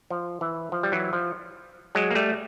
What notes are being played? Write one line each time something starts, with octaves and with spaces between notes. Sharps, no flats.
F3
E3
F3
G3
E3 F#3
F3
F#3 G#3
A#3
G3 A3